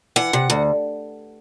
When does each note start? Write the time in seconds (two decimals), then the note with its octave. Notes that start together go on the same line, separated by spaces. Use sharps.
0.16 E3 F#5
0.33 C3
0.50 D2